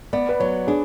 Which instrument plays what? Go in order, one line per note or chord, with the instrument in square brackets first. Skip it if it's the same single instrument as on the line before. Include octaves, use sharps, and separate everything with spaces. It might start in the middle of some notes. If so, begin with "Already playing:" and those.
[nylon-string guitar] B3 [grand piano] D5
[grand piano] B4
[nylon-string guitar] F#3 [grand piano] C#5
[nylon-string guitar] D4 [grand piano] G#4